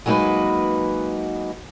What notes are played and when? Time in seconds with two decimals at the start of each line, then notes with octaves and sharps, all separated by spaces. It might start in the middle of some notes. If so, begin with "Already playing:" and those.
0.06 F#3 G#3 A#3 D#4 F#4 B4